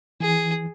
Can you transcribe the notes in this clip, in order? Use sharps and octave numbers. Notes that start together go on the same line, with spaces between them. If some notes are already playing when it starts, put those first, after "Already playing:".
E3 G#4